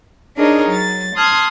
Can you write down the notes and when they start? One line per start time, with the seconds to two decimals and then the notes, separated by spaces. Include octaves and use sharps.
0.37 D4 D#4 G#4 A#4 C#5 D#5
0.71 F#3 A6
1.15 A5 C6 D#6 F6 F#6 G#6